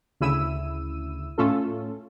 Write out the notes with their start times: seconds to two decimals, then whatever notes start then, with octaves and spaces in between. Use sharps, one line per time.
0.20 D2 C#3 E4 E6 D#7
1.38 A2 A3 C#4 F4 A4